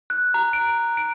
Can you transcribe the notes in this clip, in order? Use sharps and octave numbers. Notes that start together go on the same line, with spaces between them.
F#6
A#5
D7
D7